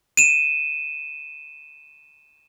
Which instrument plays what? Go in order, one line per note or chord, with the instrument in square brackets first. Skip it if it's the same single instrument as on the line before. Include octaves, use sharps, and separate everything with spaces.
[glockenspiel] D#7 E7